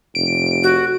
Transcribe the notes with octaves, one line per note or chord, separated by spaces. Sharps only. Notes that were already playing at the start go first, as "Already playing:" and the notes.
F1 D7
F#4